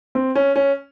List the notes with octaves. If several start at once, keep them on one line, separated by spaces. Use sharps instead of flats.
C4
C#4
C#4